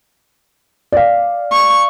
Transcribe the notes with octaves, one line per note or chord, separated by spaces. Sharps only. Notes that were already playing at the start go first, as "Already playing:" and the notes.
D5 F5
C#6